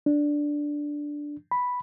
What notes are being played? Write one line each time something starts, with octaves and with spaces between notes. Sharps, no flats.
D4
B5